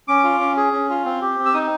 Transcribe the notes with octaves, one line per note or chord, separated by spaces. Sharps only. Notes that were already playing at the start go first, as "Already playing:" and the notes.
C#4 D6
F4
C#4
G#4
C#4
F4
C4
G4
C4
E6
D#4 D#6